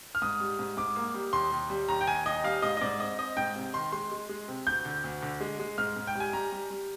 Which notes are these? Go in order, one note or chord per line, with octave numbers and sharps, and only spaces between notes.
F6
G#2 D#6
G3
G#2
G#2 D6
A#3
G3
D#2 C6
D#2
G3
D#2 A#5
G5
D#2 G#5
D#2 D#5
G3 F5
G#2 D#5
D#5
G#2 D5
C4 D#5
C4 D#5
G#2 G5
C3
D#3 C6
G#3 C6
G#3
G#3
C3
D2 G6
D3
D2
D3
G#3
G#3
G#2 F6
G#2
G5
G3 G#5
G3 A#5
G3
G3